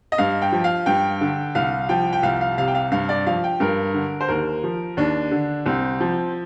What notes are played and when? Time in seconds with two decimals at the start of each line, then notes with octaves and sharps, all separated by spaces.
0.12 D#5
0.18 G2 F5
0.42 G5
0.52 F3
0.64 F5
0.86 G2 G5
1.21 D3
1.55 C2 F5
1.89 F3 G5
2.13 G5
2.23 C2 F5
2.41 F5
2.58 C3 F5
2.68 G5
2.75 F5
2.92 G2 F5
3.09 D5
3.27 F3 F5
3.44 G5
3.60 G2 A#4
3.94 D3
4.21 C5
4.28 D#2 A#4
4.64 F3
4.97 D#2 D4
5.31 D3
5.66 C2 C4
6.00 F3